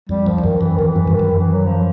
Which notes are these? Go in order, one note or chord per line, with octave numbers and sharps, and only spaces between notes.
F2 G3
F#2 F3
F2
F#2 D#3
F#2 E3
F2 D#3
E3
F#2
G2
D#3
F#2
E3
F#3
F3